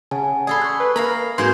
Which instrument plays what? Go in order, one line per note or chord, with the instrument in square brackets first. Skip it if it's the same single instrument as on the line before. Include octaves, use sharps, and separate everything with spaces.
[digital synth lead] C#3 [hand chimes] F#5 G#5 A5
[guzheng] G#4 A4 C6 [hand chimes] D5 B5
[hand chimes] C#6 F#6
[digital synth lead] B4
[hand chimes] A#3 [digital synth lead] A#4 [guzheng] F5 A#5 B5
[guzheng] G#2 A#3 C5 [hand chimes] C4 F#4 B4 [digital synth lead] C6